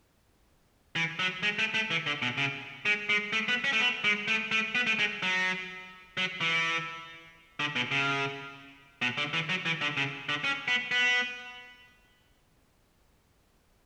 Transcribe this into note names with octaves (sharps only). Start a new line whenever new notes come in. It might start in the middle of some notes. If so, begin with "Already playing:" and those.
E3
F#3
G#3
A3
A3
E3
D3
B2
C#3
G#3
G#3
A3
B3
C#4
A3
B3
G#3
A3
A3
B3
A3
G#3
F#3
F#3
E3
D3
B2
C#3
B2
D3
E3
F#3
E3
D3
C#3
D3
C#4
B3
B3